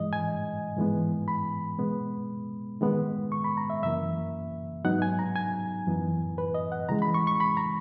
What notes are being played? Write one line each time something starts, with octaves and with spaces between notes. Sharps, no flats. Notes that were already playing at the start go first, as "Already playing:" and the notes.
Already playing: G#2 E3 G#3 D#5
G#5
G#2 E3 G#3 B3
B5
B2 G#3 B3
D#3 G#3 B3
C#6
B5
A#5
E5
F#2 C#3 E3 A#3 E5
G#2 F#3 B3 D#4 F#5
G#5
A#5
G#5
F#2 E3 B3
B4
D#5
F#5
C#3 E3 G#3 A#5
B5
C#6
C#6
B5
A#5